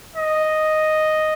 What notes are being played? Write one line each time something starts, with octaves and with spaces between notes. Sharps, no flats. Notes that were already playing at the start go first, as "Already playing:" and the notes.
D#5